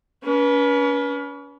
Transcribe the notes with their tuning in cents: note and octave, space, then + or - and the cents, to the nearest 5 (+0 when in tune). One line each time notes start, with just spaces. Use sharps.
C#4 +40 B4 -30